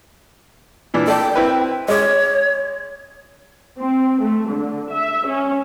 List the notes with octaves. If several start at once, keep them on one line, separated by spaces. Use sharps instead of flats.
A#2 E3 D4
A4 D5 G5
C4 E4 B4
G#3 C#5 D6
C4
A3
D3
E5
C#4